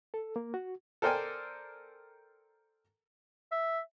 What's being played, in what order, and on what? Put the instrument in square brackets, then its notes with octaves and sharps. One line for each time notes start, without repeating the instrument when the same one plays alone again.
[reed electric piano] A4
A#3
F#4
[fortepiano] A4 A#4 C5 D5 G5 G#5
[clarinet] E5